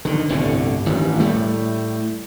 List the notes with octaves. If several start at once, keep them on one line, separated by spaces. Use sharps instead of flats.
D3 D#3
G1 C2 A2 D3
A1 G2 D#3
A2 G3 A3